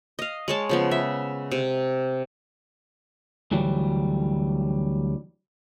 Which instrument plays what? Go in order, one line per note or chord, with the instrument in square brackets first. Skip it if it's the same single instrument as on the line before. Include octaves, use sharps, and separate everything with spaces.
[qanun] D#5 F5
G#3 C#5 A5
C#3 F3 B3
E5
C3
[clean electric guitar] D2 E3 F#3 G3